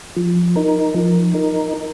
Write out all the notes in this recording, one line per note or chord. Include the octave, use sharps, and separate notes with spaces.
F3
D#4 A#4
F3
D#4 A#4